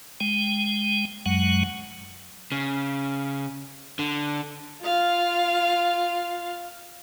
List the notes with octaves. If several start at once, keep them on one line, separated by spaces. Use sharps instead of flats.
G#3 G5
F#2 F#3 G#3 F#5
C#3
D3
F4 F5